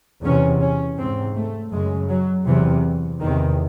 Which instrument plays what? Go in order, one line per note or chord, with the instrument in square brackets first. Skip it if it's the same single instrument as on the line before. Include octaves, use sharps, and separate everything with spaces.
[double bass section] E2 C3 C#4
C#4
G#2 C4
A3
F#2 C#3 G#3
F#3
E2 C3 E3
E2 C3 D#3